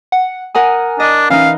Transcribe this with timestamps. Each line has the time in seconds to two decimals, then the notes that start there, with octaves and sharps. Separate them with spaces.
0.12 F#5
0.55 A#4 F#5 G#5 D#6
1.00 D4 D#5
1.30 E3 C#4 D#4 F5